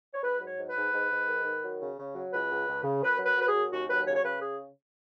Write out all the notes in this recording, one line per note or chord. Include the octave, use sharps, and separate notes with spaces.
C#5
G#2 B4
F#3
C#5
G#2
B4
G#2
G#2
G#2
D#3
D#3
F#3
C#3
C#3
F#3
C#2 B4
C#2
C#2
C#3
F#2 B4
F#3
B4
F#3 B4
G#4
F#2
D#2 F#4
F#3 B4
C#3 C#5
C#5
C#3 B4
G#4